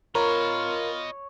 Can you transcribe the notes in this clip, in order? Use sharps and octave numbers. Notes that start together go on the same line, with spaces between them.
F4 A#4 C#5 D#5 B5